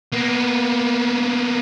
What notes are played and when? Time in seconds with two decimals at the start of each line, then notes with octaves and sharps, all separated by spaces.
0.12 A#3 B3